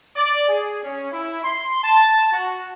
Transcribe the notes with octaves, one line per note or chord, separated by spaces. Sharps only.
D5
G#4
C#4
E4
C6
A5
F#4